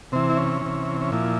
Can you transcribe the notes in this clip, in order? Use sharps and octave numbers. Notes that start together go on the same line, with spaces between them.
C3 E3 C4
E4
C#4
C3 E3
C#4
A#2 F3 E4